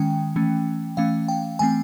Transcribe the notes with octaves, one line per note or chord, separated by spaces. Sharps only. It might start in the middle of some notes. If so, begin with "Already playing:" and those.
Already playing: D#3 G#3 C#4 G5
E3 A3 C#4
E3 A3 C#4 F5
G5
E3 A3 C4 G#5